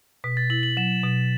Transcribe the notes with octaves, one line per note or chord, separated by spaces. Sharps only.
B2 B6
A6
E4 F#7
F#7
F#3 E7
B2